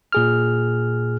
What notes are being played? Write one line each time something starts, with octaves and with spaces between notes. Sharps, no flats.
A#2 G#4 F6